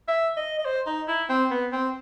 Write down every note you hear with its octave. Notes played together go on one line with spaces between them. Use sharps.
E5
D#5
D#5
C5
D#4
E4
C4
B3
C4